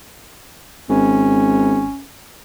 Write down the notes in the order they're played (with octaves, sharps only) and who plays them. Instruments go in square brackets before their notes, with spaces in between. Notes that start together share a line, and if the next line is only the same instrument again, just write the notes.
[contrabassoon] G#1 [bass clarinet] C#4